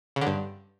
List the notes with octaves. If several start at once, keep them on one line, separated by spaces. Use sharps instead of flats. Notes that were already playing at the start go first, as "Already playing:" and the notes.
C#3
D3
G2